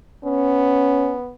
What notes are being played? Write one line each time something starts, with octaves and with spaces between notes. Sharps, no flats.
B3 C#4